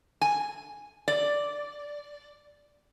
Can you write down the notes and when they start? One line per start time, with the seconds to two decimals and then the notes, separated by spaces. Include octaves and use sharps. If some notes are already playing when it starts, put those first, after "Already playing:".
0.21 G#5
1.08 D5